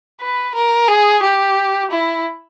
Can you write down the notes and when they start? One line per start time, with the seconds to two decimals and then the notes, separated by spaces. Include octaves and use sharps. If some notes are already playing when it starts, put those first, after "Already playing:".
0.21 B4
0.55 A#4
0.88 G#4
1.23 G4
1.91 E4